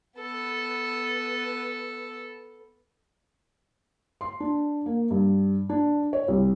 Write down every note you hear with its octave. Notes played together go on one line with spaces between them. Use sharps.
B3 A4
C6
D4
A#3
G2
D4
C#5
C2